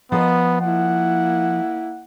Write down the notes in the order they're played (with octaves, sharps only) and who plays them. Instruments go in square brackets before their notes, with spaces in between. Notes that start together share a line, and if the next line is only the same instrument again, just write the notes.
[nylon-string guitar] F3 A#4 D#5 [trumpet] B3
[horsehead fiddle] A#3 E4 [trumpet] F#5